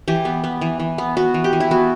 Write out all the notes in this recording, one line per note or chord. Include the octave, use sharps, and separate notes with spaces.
E3 G4
B3
B3
E3
E3
B3
B3 F#4
E3
G4
E3
E4
B3 F#4